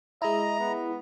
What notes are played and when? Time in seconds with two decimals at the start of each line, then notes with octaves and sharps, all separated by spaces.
0.22 G#3 E4 D#5 A#5
0.59 B3